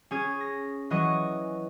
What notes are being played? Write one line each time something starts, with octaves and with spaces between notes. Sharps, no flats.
C#4 G#4 G#6
A#6
E3 F#3 D#5 C#6